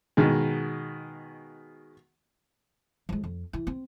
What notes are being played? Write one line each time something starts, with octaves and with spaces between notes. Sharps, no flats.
B2 D#3 G#3
F3 G#3
F2
E3
C4